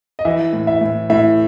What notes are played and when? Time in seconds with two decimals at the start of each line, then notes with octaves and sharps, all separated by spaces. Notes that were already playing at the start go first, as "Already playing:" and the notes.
0.19 D#5
0.25 E3 E5
0.53 A2
0.67 E5
0.81 A2
1.10 A2 E5